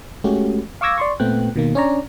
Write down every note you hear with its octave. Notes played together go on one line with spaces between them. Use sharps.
G#3 A3 C#4 F#4 G4
F5 C#6 D6 E6 G#6 A#6
D5 C6 C#6
A#2 A3 B3 C4 G5 F#6
B2 D#3 A#3
C#4 D4 C#5 D5 A#5